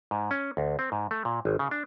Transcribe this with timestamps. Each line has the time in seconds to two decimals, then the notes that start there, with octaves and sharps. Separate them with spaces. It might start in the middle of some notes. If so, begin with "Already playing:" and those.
0.11 G#2
0.31 C#4
0.57 D2
0.79 C4
0.92 G#2
1.11 A3
1.25 A#2
1.45 G#1
1.59 C#3
1.71 D4